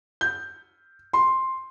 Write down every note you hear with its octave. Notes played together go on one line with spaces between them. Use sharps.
G6
C6